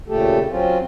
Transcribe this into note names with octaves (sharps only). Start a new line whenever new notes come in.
A#2 C#3 A3 G4 A4
F#3 C4 C#4 F4